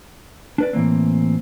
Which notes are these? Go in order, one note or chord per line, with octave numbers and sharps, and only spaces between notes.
D4 B4 D5
A2 E3 A#3 C4